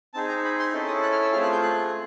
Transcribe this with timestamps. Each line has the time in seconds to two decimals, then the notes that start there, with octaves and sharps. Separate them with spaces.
0.14 C4 D#4 G#4 A5
0.29 A#5
0.44 B5
0.59 C6
0.73 C#4 E4 A4
0.88 D#6
1.03 F#6
1.12 F6
1.22 E6
1.32 A3 C4 F4 G#4 F6
1.43 F#6
1.52 G6
1.63 F#6